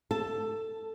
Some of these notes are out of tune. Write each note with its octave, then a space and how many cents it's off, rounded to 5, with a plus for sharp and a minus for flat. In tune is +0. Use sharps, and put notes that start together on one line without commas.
A4 +15 A5 +0